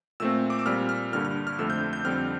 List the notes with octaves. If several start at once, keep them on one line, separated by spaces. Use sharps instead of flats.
A#2 A3 C4 E6
D6
E6
A#2 G3 C4 F6
F6
G2 D3 G3 A#3 F6
F6
F6
F2 D3 A3 C4 E6
G6
G6
F2 D3 G3 C4 F6